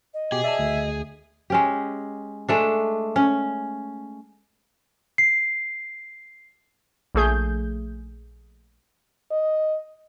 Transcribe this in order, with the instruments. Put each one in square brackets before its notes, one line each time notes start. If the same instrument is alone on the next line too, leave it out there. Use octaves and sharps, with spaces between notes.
[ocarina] D#5
[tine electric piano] B2 G4 [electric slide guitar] G#4
[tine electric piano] D5 A5 [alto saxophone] E5
[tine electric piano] D2
[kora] G#3 C#4 G4
G#3 A3 D4
C#4
[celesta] C7
[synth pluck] A#1 A3 G#4 G6
[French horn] D#5